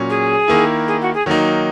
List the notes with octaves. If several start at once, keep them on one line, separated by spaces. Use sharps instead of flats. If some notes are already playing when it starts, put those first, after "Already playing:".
Already playing: A#2 F#3 C#4
G#4
D#3 A#3 E4
G#4
F#4
G#4
D#3 F#3 A#3 D#4